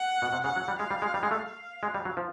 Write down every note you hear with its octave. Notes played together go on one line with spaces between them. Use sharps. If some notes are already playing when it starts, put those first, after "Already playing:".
Already playing: F#5
B2
C3
C#3 F#5
F#3
G3
G#3 F5
G3
G#3
G3
G#3
A3
F5
G#3
G3
F#3
F3